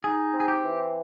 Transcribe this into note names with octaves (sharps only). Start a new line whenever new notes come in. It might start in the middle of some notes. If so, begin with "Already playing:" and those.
D#4 G#4
C4
G#4
G4
E3